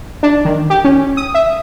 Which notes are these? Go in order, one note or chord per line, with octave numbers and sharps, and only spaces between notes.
D4
D#3
G4
C#4
D#6
E5